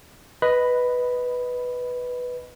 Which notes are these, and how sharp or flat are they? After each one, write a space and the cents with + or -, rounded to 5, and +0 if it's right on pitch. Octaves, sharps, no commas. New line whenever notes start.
B4 +0 D#5 +0 B5 +5